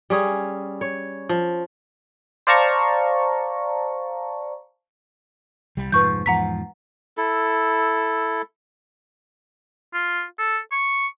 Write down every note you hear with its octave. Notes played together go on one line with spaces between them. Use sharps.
G3 C#4 G#4
C#5
F3
C5 D5 F5 A5 A#5 C#6
C2 G3
F1 G#2 F3 B4 C#6 G6
E2 G#2 F3 F#5 A#5 B6
E4 A4
F4
A4
C#6